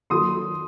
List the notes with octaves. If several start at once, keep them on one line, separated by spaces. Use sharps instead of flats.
D#3 F#3 A#3 F4 A4 C6 D#6